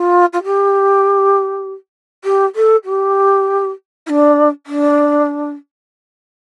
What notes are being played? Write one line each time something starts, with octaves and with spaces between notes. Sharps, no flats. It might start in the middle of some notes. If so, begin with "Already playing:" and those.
Already playing: F4
F4
G4
G4
A4
G4
E4
D4
D4